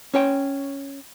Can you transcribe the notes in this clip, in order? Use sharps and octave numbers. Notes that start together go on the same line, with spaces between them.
C#4 C#5 G5